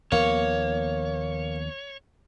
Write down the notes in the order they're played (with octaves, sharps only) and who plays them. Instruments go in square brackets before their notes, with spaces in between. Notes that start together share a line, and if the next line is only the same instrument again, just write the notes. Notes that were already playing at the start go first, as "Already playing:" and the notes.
[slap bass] D#2 F3 B3 [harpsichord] A#3 [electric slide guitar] C#5